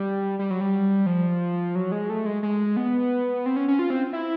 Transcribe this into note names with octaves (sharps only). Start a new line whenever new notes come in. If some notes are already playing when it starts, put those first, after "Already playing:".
Already playing: G3
G3
F#3
G3
F3
F#3
G#3
A3
G#3
G#3
B3
C4
C#4
C#4
F4
C4
E4